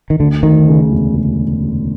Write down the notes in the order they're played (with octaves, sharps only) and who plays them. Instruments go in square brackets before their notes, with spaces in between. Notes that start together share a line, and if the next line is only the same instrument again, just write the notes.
[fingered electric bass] D#3
[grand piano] D2 [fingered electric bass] D3
[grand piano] D2 [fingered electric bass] D#3
[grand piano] C#3
E1
C#3